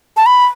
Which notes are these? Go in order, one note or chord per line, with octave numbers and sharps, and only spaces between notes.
A5
B5